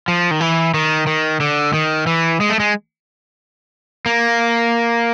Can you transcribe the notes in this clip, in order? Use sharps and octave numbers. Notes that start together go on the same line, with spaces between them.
F3
D#3
E3
D#3
D#3
D3
D#3
E3
G#3
A3
G#3
A#3